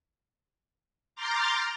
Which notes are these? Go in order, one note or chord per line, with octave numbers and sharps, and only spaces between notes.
A#5 C6 D6 F6 G6 A6